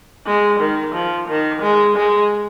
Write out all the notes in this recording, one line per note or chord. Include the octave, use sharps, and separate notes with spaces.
G#3
D#3
F3
D#3
G#3
G#3